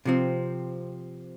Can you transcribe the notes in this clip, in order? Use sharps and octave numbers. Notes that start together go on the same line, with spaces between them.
C3 F3 C4